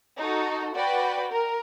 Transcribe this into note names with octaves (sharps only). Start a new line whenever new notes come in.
D#4 F#4 A4
F#4 B4 D5 G5
A#4